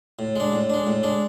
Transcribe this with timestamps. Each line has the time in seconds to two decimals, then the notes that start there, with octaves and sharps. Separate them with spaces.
0.19 A2
0.36 G#3 D4
0.52 A2
0.70 G#3 D4
0.87 A2
1.03 G#3 D4